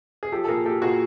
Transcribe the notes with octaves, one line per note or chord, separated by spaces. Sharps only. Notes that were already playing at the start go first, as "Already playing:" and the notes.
G#4
F3 G4 A4
A4
A#2 G#4 A#4
A#3 G4 A4
A#2 F#4 G#4